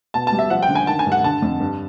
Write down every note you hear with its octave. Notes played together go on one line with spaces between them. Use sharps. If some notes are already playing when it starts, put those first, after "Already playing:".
B2 A5
A5
G3
E5
F3 F#5
G5
D3
G#5
D#3 A5
G#5
G2
F#5
D3 A5
F2
G2